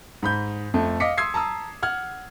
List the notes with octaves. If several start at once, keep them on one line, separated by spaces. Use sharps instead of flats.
G#2 B5 G6
F2 A3
D#5 F5 D6 B6 C#7
C6 D#6 E6 G#6 C7
A5 A#5 D#6 E6
F#5 F6 G#6